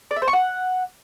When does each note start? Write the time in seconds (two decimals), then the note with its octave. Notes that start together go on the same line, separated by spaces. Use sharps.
0.11 D5
0.16 E5
0.22 C5
0.28 C#6
0.33 F#5